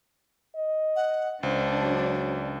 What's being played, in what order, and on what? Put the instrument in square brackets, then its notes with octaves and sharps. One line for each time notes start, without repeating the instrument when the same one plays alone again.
[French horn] D#5
[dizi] F#5
[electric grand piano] C#2 [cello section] D4 [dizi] C5
[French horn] F#3